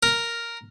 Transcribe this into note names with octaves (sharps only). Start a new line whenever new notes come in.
A#4